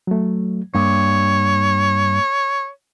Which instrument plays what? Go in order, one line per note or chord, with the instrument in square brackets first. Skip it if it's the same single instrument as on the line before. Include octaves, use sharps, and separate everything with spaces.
[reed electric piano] F#3 A3
[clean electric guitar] G2 [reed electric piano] A#3 [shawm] C#5